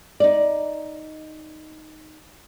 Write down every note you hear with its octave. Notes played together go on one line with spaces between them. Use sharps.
D#4 D5